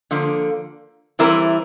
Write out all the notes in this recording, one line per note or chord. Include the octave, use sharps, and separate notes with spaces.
D3 F3 A#3
E3 G3 C4 E4 A#4